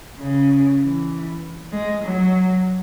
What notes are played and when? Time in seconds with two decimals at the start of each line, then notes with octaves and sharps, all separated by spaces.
0.19 C#3
0.81 E3
1.72 G#3
2.03 F#3